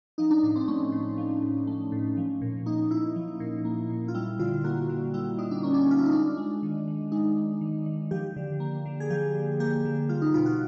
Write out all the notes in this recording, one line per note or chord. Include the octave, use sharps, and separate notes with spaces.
F3 D#4
D4
A2 D4
C4
A3 C#4
A2
F3
A2
A3
A2
F3
A#2
A#3 D#4
A#2 E4
F3
A#2
A#3
A#2
F4
G3 E4
D3 F4
A#3 F#4
D3
G3 E4
D3 D#4
D4
A#3 C#4
D4
D3 F4
E4
D#4
G#3 D4
G#3
D#3
D#3
G#3 D#4
G#3
D#3
D#3
F3 G4
D3
A#3
D3
G#4
F3 G4
D3
A#3 G4
D3
G3 F4
D#4
B2 F4
F#4